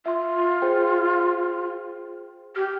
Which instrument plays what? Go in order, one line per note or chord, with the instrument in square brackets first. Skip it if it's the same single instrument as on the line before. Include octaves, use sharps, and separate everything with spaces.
[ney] F4 [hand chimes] E5 C6
[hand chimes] G#4 C5 G5
[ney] G4 [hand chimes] F6